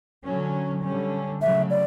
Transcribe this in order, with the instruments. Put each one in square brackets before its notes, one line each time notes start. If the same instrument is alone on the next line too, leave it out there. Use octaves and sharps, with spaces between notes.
[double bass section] D3 F#3 C#4
D3 G3 C#4
[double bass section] C#3 F#3 A3 [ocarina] E5
[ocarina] D5